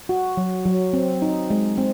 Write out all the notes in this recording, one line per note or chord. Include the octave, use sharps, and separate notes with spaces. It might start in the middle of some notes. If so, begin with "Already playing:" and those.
F#4
F#3
F#3
C4
D#4
G#3
C4